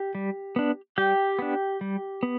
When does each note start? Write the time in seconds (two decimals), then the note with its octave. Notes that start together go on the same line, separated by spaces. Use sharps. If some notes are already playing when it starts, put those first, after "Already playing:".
Already playing: G4
0.15 G3
0.56 B3 D4
0.98 G3 G4 G5
1.39 B3 D4
1.81 G3
2.23 B3